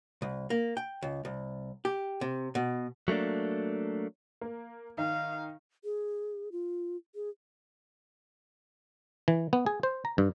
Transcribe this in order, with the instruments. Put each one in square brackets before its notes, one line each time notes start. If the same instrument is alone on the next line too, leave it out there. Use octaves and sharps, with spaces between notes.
[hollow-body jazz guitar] C2
A#3
G5
C#2
C2
G4
C3
B2
[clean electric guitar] F#3 A3 A#3 D4
[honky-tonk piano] A#3
[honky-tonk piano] D#3 D#4 [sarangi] F5
[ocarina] G#4
F4
G#4
[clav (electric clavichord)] E3
B3
G#4
C5
A#5
G2